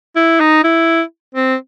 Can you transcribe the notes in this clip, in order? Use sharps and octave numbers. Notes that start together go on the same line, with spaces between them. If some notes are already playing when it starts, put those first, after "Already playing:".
E4
D#4
E4
C4